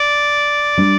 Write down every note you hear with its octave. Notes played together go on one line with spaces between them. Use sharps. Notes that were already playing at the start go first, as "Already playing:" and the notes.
Already playing: D5
G3 D4